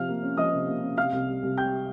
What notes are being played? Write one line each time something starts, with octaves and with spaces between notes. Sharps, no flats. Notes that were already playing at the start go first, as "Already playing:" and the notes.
Already playing: C3 F3 F5 F6
A#3
C#4
F3 D#5 D#6
C3
A#3
C#4
C3 F5 F6
C2
G3
C2
C3 G5 G6